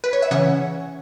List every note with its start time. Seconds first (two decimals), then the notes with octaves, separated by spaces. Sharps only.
0.04 B4
0.13 C#5
0.22 E5
0.31 C#3 E3 C#4 C#5 F#5